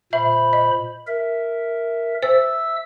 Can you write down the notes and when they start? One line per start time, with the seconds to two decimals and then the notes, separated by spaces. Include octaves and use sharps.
0.13 A#2 C5 E5 B5
0.53 D#5
1.07 A#4 E5
2.23 C5 E5 E6